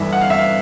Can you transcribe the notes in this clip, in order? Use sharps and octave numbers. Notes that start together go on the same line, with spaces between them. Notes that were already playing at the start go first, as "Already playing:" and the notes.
Already playing: G1 G2 E3 E5
F#5
F5
E5
F5